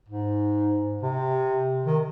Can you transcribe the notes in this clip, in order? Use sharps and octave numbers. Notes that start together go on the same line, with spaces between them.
G#2
C3
D#3